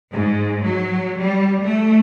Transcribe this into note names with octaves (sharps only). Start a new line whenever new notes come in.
G#2
F#3
G3
A3